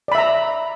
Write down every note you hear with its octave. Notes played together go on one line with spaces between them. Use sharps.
D5 E5 A#5 B5